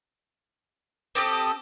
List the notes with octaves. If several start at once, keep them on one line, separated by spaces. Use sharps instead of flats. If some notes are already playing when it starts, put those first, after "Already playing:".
C4 G4 A4 D#6